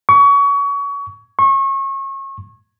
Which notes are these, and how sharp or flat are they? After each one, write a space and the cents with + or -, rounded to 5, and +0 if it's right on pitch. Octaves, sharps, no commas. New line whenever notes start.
C#6 +30
C#6 -30